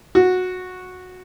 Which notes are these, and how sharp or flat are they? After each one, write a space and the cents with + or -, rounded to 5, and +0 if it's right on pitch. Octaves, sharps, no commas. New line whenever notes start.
F#4 -15